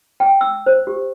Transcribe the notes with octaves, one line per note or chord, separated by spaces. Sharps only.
G5
E6
C5
G4